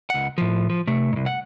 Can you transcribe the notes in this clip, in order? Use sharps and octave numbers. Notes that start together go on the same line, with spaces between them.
C#2 F#5
A2 F3
F3
C3 A3
C2 G#2
F#5